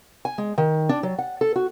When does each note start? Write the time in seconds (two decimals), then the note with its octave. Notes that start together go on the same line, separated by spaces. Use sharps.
0.25 G#5
0.38 G#3
0.58 D#3
0.89 D4
1.03 F#3
1.19 F#5
1.41 A4
1.56 F#4